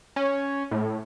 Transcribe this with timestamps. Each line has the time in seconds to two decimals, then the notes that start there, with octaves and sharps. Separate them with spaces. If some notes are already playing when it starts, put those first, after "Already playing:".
0.16 C#4
0.71 A2